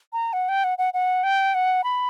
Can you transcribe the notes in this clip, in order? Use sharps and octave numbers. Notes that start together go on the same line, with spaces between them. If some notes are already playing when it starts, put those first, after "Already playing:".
A#5
F#5
G5
F#5
F#5
F#5
G5
F#5
B5